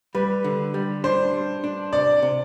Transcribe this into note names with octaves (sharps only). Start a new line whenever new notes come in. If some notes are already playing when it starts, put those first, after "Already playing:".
G3 B4
D3
G3
D4 C5
G3
D4
C3 D5
C3